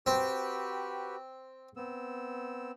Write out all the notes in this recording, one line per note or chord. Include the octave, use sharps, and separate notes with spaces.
C4 F#4 G4 B4
B3 C4 E6